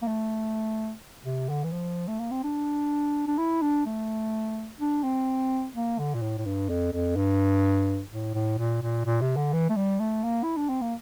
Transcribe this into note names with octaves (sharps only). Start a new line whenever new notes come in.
A#3
A3
C3
D3
E3
F3
A3
A#3
C4
D4
D4
E4
D4
A3
D4
C4
A#3
D3
A#2
A2
A2
G2
F2
F2
G2
A2
A2
A#2
A#2
A#2
C3
D3
E3
A3
G3
A3
A#3
E4
D4
C4
A#3